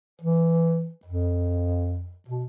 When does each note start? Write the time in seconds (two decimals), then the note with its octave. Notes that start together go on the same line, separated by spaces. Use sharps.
0.22 E3
1.06 F2
2.28 B2